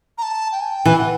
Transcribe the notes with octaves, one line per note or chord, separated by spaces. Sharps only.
A#5
A5
G5
G#5
G5
E3 G#5
F#5